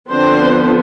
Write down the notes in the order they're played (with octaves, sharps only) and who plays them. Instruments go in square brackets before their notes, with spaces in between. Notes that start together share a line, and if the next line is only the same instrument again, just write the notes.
[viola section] D3 F3 B3 C4 D4 C5